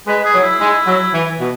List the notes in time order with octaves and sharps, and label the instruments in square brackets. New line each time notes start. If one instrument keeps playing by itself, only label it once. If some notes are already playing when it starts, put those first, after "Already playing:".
[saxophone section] G#3 [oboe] B4
[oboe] G#4
[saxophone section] F#3
[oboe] E4
[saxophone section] G#3
F#3
E3
B2